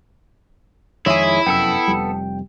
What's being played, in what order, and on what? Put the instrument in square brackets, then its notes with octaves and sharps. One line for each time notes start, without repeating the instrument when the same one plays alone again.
[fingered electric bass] F2 D#3 [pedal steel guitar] G#3 G#4 [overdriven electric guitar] E4 [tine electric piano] C#5 E5 B5
[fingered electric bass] F1 F#2 [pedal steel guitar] B3 A4 E6 [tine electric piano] G5
[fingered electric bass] F1 F2 G3